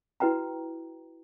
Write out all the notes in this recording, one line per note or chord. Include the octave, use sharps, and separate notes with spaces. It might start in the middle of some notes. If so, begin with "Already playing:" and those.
E4 F#4 B4 G5 A#5